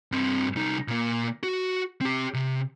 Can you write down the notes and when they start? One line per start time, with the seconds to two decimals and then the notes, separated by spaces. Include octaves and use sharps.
0.12 G2 C4
0.56 C2 D#4
0.88 A#2 A#3
1.43 F#4
2.01 C4 G4
2.34 C3